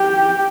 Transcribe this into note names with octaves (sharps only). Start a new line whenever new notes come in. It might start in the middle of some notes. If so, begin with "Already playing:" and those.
Already playing: G4